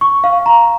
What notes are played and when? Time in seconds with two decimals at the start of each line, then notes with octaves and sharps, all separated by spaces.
0.01 C#6
0.24 F5
0.46 A#5